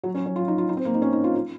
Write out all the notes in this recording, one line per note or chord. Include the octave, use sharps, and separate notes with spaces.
F#3
C#4
C#4
F4
D#4
F4
D#4
C4
A#3
D#4
C#4
D#4
F4
F4